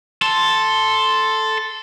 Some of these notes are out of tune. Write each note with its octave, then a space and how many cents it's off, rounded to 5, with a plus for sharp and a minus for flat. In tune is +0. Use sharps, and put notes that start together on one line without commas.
A4 +0 C6 +0